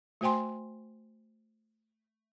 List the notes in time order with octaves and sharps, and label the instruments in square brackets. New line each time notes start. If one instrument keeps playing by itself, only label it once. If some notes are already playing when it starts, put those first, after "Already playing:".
[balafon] A3 F#4 C5 G5 G#5 C6